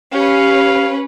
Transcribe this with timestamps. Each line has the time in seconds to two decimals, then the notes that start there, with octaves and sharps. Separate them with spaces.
0.14 C#4 G4 B4 F5